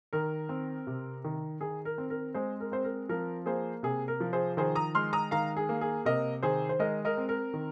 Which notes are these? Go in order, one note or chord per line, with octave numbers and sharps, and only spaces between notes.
D#3 A#4
C4
C3
D#3
D#3 G#4
A#4
C4
A#4
G#3 G#4 C5
A#4
C4 C5
A#4
F3 A#4
A#3 G#4 C5
C3 G#4
A#4
F3
G#4 C5
D#3 G#4 C5
A#5 D#6
G#3 C6 F6
A#5 D#6
D#3 F5 A#5
G#4
A#3
G#4
C3 A#4 D#5
D#3 G#4 C5
C5
G#3 A#4 D#5
A#4 D#5
C4
A#4
D#3